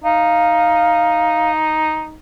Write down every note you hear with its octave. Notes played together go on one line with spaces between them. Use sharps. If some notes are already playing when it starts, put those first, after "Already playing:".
D#4 F5